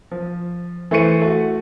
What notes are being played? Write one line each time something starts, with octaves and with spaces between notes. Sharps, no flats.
F3
E3 A3 C5 C#6 C#7 D#7
A3 F#4